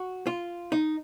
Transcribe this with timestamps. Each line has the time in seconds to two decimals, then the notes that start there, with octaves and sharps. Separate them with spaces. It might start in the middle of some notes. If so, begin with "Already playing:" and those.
Already playing: F#4
0.27 F4
0.72 D#4